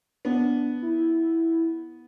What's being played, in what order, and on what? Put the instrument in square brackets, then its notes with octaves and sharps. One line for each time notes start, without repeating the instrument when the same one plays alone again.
[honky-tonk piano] B3 [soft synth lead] D4
[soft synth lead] E4